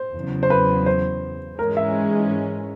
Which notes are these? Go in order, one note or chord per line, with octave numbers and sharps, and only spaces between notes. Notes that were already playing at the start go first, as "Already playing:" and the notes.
Already playing: C5
E2 C#3 F#3
C5
B4
C5
G#2 E3 G#3 C#4 A#4
E5